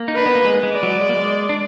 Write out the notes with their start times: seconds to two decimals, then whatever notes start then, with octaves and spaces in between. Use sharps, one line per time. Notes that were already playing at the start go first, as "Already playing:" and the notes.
Already playing: A#3
0.08 D#4
0.16 D4 B4
0.26 B3
0.35 A#3
0.45 G#3
0.63 G#3
0.72 D5
0.83 F#3
1.01 G#3
1.09 A#3
1.16 G#3
1.49 D4